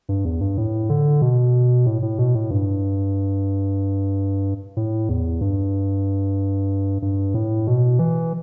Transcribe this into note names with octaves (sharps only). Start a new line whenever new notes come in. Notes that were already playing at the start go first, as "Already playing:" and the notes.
G2
E2
G2
A2
D3
B2
A2
A2
B2
A2
G2
A2
E2
G2
G2
A2
B2
E3